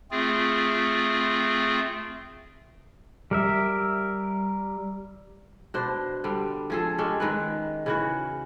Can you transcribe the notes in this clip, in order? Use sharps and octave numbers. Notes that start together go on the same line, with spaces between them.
A3 C4 F4 G#4
G3 A#4 E5
B2 D4 C5
D3 G3
F3 G#4 A4
G#3 C#4 G4 A4
D#3 G#3 B4
C#3 E3 F#4